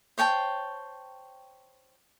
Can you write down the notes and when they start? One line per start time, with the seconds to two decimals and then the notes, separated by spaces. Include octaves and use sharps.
0.18 C5 C#5 G5 A5